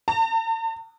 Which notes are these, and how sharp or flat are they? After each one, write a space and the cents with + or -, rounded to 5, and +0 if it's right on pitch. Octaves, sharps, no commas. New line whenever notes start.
A5 +45